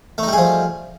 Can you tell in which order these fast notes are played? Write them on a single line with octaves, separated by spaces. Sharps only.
A3 D#4 G3 G#4 F3